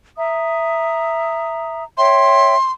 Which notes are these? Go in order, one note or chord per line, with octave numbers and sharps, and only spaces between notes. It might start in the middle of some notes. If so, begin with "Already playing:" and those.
E5 A#5 D#6
C#5 E5 G5 C6